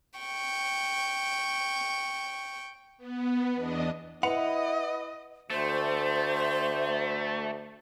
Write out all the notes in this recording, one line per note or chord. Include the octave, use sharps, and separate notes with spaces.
G5 C#6
B3
E2 D4 D#5
E4 B4 D#5 F#5 C#7 F7
D2 A3 C5